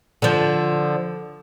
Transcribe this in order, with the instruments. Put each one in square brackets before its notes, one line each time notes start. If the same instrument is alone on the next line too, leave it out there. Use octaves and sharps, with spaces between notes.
[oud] D3 F3